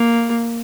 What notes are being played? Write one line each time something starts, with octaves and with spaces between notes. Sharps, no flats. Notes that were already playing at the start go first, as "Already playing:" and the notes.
Already playing: A#3